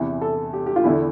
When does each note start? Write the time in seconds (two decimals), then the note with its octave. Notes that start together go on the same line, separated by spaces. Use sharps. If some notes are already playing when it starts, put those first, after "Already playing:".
Already playing: E2 C3 E3
0.21 A4
0.53 G4
0.66 G4
0.76 F4
0.84 E2 D3 E4